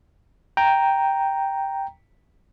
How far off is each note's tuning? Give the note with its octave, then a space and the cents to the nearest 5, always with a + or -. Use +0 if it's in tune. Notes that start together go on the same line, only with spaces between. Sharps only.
G5 +0 A#5 +0